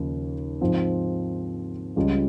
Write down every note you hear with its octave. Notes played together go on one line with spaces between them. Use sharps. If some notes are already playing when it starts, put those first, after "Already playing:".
Already playing: D#2 C#3 F3
G#2 F3 C4
C#2 C#3 G3 C#4 F4